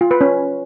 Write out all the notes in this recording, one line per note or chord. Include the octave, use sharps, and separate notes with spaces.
F4
B4
C#4